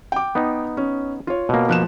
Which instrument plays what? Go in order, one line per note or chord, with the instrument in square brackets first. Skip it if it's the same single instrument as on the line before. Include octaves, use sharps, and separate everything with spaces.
[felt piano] G5 D6
[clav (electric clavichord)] B3 D#4
[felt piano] C#4
F4 C#5
[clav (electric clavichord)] B2 A#3
[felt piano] F3 F#6 E7